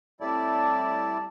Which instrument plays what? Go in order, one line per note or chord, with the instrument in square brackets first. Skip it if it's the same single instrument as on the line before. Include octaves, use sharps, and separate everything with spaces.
[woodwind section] A2 C4 A5 [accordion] G3 E4 D5